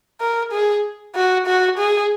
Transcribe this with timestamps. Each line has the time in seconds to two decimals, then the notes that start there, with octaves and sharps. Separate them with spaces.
0.21 A#4
0.52 G#4
1.16 F#4
1.47 F#4
1.79 G#4